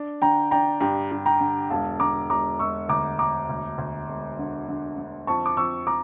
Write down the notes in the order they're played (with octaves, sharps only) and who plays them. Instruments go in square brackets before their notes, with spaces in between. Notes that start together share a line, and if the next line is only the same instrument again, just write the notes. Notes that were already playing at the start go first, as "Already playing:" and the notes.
Already playing: [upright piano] D4
[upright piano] D3 [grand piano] G5 A#5
[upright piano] D4 [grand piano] G5 A#5
[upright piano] G2 [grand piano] G5 A#5
[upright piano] G2
[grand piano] G5 A#5
[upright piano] D3
[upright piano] E1 [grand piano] F5 A5
[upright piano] D3 [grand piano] A#5 D6
[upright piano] E1 [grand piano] A#5 D6
[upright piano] E1 [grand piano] C#6 E6
[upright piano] D2 [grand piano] A#5 D6
[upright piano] E1 [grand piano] A#5 D6
[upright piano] D2
D2
E1
D3
D3
D3
[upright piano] F2 [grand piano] A5 C#6
[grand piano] D6
[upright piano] F2 [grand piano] C#6 E6
[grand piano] A#5 D6